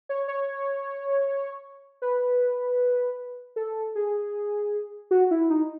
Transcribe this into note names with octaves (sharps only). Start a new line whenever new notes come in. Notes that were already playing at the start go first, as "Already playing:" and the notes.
C#5
C#5
B4
A4
G#4
F#4
E4
D#4